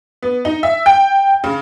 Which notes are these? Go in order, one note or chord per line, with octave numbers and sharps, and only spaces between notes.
B3
D#4
E5
G5
C#3